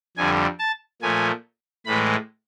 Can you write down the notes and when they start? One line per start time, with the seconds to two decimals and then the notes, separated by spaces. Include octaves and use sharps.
0.17 F2 D3 G3 G#5
0.59 A5
1.02 A#2 F3 A3 G#5
1.86 A2 E3 G#3 B5